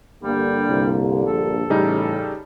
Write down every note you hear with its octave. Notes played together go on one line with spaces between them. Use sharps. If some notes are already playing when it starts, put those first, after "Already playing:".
G2 D3 G3 A#3
C2
A#1 A4
A1 C#3 G3 D#4